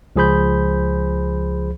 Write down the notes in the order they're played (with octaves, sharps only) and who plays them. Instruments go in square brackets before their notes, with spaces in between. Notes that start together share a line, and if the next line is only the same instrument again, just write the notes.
[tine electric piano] C#2 F3 G#4 C5 B5 G6